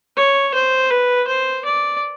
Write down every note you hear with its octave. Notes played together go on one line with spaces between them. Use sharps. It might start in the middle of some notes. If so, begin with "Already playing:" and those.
C#5
C5
B4
C5
D5